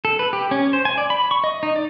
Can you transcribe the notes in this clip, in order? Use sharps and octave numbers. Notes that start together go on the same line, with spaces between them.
A4
B4
G4
C#4
C5
G#5
D5
B5
C#6
D#5
D#4
D5